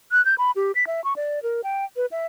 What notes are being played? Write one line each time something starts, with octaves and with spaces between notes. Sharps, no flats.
F#6
G6
B5
G4
B6
E5
C#6
D5
A#4
G5
B4
E5